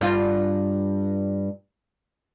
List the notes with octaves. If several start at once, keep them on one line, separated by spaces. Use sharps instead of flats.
G2 F4